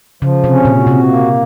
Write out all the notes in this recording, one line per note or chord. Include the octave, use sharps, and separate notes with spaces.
C#3 F3
C3
C#4
A#2
F#4
C3
A#3